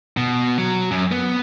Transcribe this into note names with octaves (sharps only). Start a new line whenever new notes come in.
B2
F#3
F#2
B3